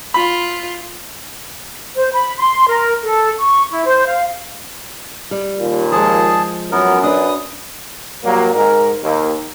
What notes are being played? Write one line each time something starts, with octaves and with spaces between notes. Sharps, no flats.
F4 B5
C5
B5
C6
A#4
A4
C#6
E4
C5
F5
G3
D#2 A#2
F3 G#3 G#4 A5
F#2 B3 A#4
D4 B4 D#6
F#3 G3 A#3
G#2 G#3 A#4
D#2